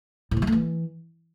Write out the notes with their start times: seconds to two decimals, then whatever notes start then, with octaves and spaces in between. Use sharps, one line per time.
0.31 A2
0.37 C3
0.42 G#3
0.47 A3
0.52 E3